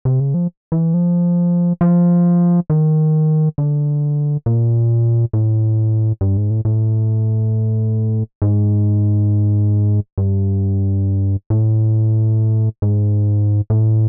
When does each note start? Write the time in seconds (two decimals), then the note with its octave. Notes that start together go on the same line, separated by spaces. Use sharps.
0.05 C3
0.20 C#3
0.34 F3
0.72 E3
0.94 F3
1.81 F3
2.70 D#3
3.58 D3
4.46 A#2
5.33 A2
6.21 G2
6.37 G#2
6.50 A2
6.65 A2
8.42 G#2
10.18 G2
11.50 A2
12.82 G#2
13.70 A2